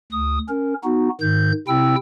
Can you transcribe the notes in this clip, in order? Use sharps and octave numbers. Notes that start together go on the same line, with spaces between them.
D2 D#6
C#4 A#4
B3 D#4 F#4
G#2 D#3 G6
C3 C4 E4 G5 E6